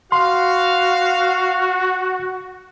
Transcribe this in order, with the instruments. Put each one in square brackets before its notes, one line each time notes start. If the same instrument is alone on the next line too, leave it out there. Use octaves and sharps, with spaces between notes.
[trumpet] F#4 [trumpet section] F5 [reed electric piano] C6